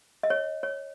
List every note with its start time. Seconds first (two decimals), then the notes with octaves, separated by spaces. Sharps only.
0.23 D#5
0.30 C#5
0.63 C#5